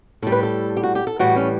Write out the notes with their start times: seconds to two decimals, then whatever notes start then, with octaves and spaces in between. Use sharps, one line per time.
0.22 A2 A4
0.27 G3
0.32 B4
0.43 A4
0.77 G4
0.83 F#4
0.95 G4
1.07 A4
1.19 A2 E3 G3 F#4
1.36 C#4